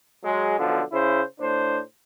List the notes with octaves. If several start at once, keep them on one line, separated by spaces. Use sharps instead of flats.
F#3 G#3
B1 D3 F3
C#3 E4 C5
A2 D4 C5